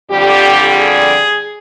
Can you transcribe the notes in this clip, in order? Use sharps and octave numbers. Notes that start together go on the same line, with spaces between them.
F2 D3 G3 G4
G#4